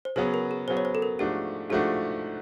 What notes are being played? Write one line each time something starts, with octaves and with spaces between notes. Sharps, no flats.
C5
C#3 F#3 B3 B4
A#4
G#4
C#3 F#3 B3 C5
C#5
C5
A4
A#4
G#2 F3 A3 D4 F#4 G4
G#2 F3 A3 D4 F#4 G4